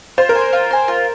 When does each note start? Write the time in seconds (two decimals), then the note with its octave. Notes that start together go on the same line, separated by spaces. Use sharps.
0.18 F4 C5
0.29 A#4
0.35 C5 G#5
0.53 F4
0.71 C5 G#5
0.88 F4